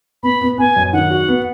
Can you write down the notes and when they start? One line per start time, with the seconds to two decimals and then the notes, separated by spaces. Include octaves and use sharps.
0.23 B3 B5
0.41 B3
0.58 B3 G#5
0.76 F#2
0.93 D#3 F#5
1.11 F#4
1.28 B3